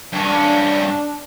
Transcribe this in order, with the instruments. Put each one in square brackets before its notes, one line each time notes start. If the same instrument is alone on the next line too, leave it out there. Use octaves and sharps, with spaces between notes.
[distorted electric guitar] G2 C#4 [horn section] D4